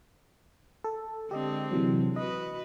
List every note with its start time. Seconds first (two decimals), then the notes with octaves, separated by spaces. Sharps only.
0.84 A4
1.31 D3 G#3 C4 G4 D#5
1.71 C3 E3 F#3
2.16 F#4 B4 D#5